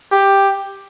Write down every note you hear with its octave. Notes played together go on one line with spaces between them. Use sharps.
G4